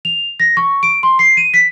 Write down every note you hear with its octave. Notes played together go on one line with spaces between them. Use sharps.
F7
A#6
C#6
D7
C6
C7
D#7
B6